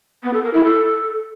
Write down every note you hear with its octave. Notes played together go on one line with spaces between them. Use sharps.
B3
A4
A#4
E4
A4